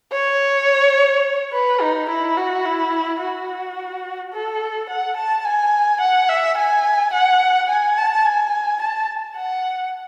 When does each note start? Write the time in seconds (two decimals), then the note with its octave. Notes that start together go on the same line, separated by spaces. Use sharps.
0.13 C#5
1.53 B4
1.81 D#4
2.09 E4
2.37 F#4
2.66 E4
3.20 F#4
4.33 A4
4.90 F#5
5.17 A5
5.45 G#5
6.01 F#5
6.29 E5
6.58 G#5
7.13 F#5
7.69 G#5
7.98 A5
8.25 G#5
8.82 A5
9.37 F#5